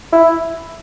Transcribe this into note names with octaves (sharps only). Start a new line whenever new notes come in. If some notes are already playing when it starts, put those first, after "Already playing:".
E4